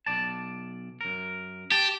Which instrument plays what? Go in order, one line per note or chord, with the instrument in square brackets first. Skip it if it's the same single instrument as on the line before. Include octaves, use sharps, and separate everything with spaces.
[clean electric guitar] B1 D5 A5
F#2 A#4
[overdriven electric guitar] G4 [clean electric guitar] A5